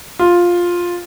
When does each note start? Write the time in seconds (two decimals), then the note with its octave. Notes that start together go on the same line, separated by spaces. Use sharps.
0.19 F4